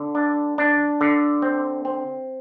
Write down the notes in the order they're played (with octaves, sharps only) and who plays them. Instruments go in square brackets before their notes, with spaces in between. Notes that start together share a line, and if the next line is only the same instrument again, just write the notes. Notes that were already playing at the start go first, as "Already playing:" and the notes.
Already playing: [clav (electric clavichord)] D3
D4
D4
D3
C4
C4